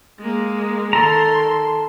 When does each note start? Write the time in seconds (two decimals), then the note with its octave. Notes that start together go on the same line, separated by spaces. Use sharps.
0.19 G#3 A#3
0.93 D#3 A4 A#5 C6